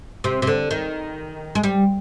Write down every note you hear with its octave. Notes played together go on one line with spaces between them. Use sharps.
C3
C3
D3
D#3
G#3
G3